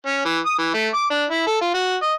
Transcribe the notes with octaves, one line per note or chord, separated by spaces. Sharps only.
C#4
E3
D#6
E3
A3
D6
D4
E4
A4
F4
F#4
D#5